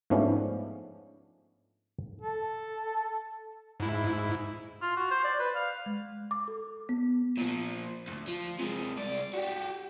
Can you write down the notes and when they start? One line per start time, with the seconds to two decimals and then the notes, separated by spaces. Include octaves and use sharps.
0.10 G#2 F3 A3 B3 C#4 D4
2.22 A4
3.80 G#2 E4
4.82 F4
4.97 F#4
5.11 C5
5.24 D5
5.40 B4
5.55 F5
5.86 G#3
6.31 D6
6.48 A4
6.89 B3
7.37 A#2 F3
8.07 D2 G#2
8.27 F3
8.59 C3 G#3
8.97 C2 D5
9.33 F#4 G4